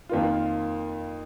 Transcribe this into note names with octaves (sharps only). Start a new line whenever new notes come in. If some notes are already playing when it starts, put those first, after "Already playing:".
F2 D#3 A#3 F4